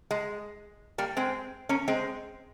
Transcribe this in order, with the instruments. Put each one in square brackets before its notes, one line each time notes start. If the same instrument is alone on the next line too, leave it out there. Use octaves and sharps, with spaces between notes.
[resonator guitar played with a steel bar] G#3
G3 A#3
G#3 C4
A#3 C#4
G#3 C4